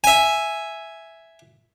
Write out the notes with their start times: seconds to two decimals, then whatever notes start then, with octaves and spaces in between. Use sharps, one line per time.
0.04 E5 G#5